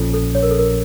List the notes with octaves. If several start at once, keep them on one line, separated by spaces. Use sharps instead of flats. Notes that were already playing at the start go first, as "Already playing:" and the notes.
Already playing: A#1 A#2 F3 C#4 F4 A4
A4
C#5
A#4
A4
A#4